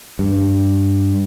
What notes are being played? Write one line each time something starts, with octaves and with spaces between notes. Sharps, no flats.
G2